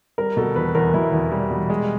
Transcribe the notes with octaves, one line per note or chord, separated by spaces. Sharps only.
G3 A#4
B2 A4
E2 B4
E2 A#4
B2 E4
E2
G3
B2
G#3